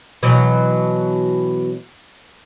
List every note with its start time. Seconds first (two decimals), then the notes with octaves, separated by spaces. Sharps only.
0.23 B2 E3 F#3